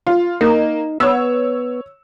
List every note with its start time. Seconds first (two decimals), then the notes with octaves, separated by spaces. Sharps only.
0.07 F4
0.41 A#3 D#4
1.00 B3 C#5 E6